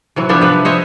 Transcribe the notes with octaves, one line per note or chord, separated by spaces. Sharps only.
C3 E3 F#3
F3 G3 B3 D4 G4 E5
C3 B4
C5 C#5 D#5 E5